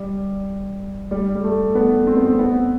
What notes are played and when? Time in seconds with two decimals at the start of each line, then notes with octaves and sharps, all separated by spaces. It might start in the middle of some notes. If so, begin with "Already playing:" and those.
Already playing: G3
1.11 G3
1.35 G3
1.44 A3
1.75 B3
2.07 C4
2.16 B3
2.25 C4
2.39 B3